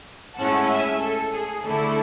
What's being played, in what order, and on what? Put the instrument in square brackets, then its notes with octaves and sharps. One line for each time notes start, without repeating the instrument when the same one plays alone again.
[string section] A2 G#3 C#4 E4 F#5 A5
E5 G#5
A4
G#4
D3 A3 E4 A4